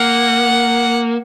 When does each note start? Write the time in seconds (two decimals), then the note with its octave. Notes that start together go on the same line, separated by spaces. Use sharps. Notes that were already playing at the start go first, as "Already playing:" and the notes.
Already playing: A#3 F#5